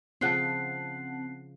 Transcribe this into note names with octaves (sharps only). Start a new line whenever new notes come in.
C#3 F3 C4 F#5 A5 F#6 C7